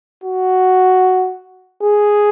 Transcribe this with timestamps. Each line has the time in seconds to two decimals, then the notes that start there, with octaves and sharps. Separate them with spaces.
0.24 F#4
1.83 G#4